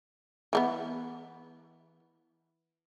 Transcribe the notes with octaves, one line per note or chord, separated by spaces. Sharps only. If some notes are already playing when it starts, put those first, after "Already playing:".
E3 A#3 B3